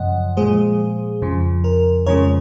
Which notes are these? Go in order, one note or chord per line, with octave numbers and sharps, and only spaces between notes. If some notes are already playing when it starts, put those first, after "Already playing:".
Already playing: F#2 C#3 F3 D#5 F#5
A#2 F3 G#3 G#4 C5
F2 C#3 F3
A#4
F2 C#3 F3 G#3 A#4 C#5